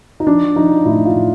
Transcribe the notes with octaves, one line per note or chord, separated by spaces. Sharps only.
D#4
F3 D4
F3 D#4
A2 E4
F4
A2